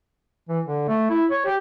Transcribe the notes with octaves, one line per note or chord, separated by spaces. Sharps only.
E3
D3
A3
E4
C#5
G4